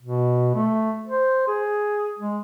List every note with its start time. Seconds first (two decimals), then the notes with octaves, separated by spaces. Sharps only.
0.03 B2
0.55 A3
1.08 C5
1.48 G#4
2.19 G#3